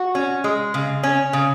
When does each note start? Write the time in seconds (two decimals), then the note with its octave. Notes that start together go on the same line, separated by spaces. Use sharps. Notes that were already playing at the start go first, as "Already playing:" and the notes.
Already playing: F#4
0.15 C#4
0.44 G#3
0.74 C#3
1.03 C#4
1.33 C#3